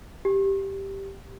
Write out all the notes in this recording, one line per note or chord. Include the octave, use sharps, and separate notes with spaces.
G4